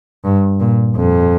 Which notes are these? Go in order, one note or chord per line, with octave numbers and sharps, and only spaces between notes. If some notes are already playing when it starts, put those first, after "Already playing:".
G2
A#2
F2